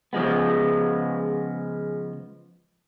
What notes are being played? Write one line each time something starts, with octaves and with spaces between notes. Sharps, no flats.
C#3 F3 G#3 B3